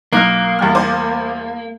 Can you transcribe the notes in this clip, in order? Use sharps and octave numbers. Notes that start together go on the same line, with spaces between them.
B1 A#3 A#5 D6 F6 F#6
E2 G3 F6
C5 G#5 D6